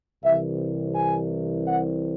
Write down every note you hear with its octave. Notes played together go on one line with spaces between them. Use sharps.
C2 C3 E3 E5
G#5
F#5